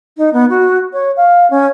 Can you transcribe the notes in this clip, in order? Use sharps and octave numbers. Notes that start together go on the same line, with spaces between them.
D#4
B3
F#4
C#5
F5
C#4